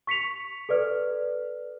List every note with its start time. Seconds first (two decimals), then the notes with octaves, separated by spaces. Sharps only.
0.07 C#6 B6 C#7 F7
0.69 A4 B4 D5 F6